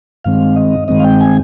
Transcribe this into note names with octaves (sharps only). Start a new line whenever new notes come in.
G2 D#3 G#3 C4 F5
D#5
G2 D#3 G#3 C4 D#5
F5
G5
G#5